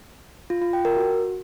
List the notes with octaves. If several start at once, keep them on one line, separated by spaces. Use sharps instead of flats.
F4
F4
G5
A#4
F#4